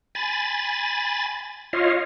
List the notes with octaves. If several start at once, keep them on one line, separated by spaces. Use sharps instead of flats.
G#5 B5 A6
F4 C#5 D#5 F5